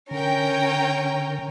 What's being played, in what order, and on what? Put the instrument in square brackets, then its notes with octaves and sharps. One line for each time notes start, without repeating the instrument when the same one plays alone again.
[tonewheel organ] D3 [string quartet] C#4 [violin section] A#4 G5